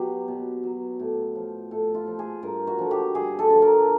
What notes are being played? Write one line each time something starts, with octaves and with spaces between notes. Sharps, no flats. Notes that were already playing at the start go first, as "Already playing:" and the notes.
Already playing: B2 F#3 G4
B2
F#3
A2
F3
A2 A4
F4
F3
G#4
G2 A#4
F#4
D3 F3
G4
G2 G#4
A4
D3 F3
A#4